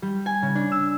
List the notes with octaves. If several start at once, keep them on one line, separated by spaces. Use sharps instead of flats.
G3
G#5
C#3
D4
E6